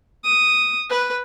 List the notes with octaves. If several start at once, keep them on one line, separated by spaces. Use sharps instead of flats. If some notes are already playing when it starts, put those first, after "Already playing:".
D#6
B4